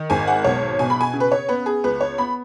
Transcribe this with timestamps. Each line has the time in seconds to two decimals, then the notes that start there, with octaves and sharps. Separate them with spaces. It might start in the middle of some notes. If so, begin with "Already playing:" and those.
Already playing: D#3
0.10 G#1 G#5
0.27 F#5
0.44 B1 C#5
0.79 B2 G#5
0.90 B5
1.01 G#5
1.13 C#3
1.20 B4
1.32 C#5
1.49 B3 B4
1.66 G#4
1.84 C#2 B4
2.01 C#5
2.18 B3 B5